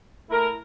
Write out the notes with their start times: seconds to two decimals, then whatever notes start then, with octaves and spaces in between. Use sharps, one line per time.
0.28 A3 E4 A#4